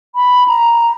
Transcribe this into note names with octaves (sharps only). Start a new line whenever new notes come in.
B5
A#5